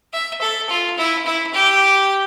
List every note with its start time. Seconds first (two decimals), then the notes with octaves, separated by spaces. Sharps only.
0.13 E5
0.41 A4
0.69 F4
0.98 E4
1.26 E4
1.53 G4